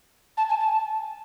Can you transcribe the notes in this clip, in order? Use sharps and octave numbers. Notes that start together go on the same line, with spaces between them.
A5
G#5
A5